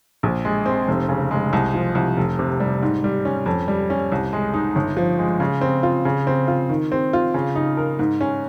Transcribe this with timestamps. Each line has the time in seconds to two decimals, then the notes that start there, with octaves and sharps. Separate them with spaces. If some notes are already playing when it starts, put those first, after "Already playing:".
0.23 A#1
0.45 G#3
0.66 C4
0.88 F1
1.09 C#3
1.31 G#3
1.53 C2
1.74 F3
1.95 C2
2.17 F1
2.39 C3
2.60 G3
2.82 G#2
3.04 G3
3.25 C#4
3.46 F2
3.68 G3
3.90 C#4
4.12 C2
4.33 G#3
4.54 D#4
4.75 G1
4.97 F3
5.19 G#3
5.40 C#3
5.61 C4
5.83 F4
6.05 C#3
6.27 C4
6.48 F4
6.69 D#3
6.92 C4
7.13 F4
7.34 C#3
7.55 D#4
7.77 A#4
7.99 G#2
8.21 C#4